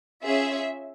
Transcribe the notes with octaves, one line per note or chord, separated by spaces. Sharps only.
C#4 F4 G#4 E5